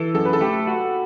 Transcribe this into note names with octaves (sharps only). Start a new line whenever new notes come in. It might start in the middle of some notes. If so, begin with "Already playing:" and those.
Already playing: E3 A4
F#2 A4
B4
A4
A3 G4
F#4